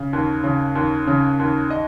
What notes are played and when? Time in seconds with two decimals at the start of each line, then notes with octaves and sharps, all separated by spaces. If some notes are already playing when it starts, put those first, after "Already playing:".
Already playing: C#3
0.13 D#2
0.44 C#3
0.75 D#2
1.07 C#3
1.39 D#2
1.70 D#5